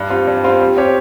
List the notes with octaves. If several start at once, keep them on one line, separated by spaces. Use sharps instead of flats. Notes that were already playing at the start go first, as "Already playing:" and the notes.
Already playing: G2
G3 C4 F4
G2
G3 C4 F4
G3
C4 G4 C#5